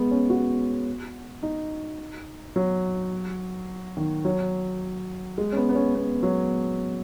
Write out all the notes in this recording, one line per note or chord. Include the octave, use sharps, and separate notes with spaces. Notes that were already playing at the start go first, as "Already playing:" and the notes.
Already playing: G#3 B3
C#4
F#4
D#4
F#3
D#3
F#3
G#3
C#4
B3
B3
C#4
B3
F#3